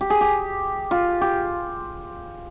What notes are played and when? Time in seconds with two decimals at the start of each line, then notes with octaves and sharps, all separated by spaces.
0.01 G4
0.10 G#4
0.21 G4
0.91 F4
1.21 G4